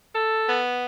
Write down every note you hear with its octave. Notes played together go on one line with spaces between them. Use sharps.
A4
B3